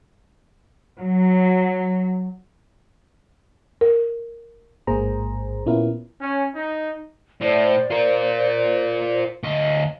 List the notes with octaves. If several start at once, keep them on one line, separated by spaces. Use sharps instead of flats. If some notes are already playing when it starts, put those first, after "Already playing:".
F#3
A#4
A1 G#2 A#3 G#4 C5 A#5
A#2 B3 C#4 E4 F4 A#4
C#4
D#4
A2 C5 D5
F4 A#4
D2 D#5